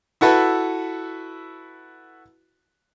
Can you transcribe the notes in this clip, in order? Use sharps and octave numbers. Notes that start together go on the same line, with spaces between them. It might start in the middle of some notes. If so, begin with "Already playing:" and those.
E4 F#4 A4 B4